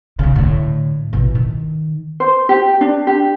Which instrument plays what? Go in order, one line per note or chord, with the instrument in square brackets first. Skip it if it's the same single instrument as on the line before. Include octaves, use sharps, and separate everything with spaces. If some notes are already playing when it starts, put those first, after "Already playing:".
[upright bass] B1 C#3
A2 D3
A1 B2
D#3
[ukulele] C5
G4
D4
G4